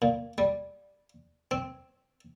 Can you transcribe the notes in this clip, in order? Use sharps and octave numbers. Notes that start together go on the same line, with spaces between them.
A#2
G3
C4